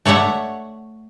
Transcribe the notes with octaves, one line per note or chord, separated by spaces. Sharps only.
A3 C#5 D5 E5 F#5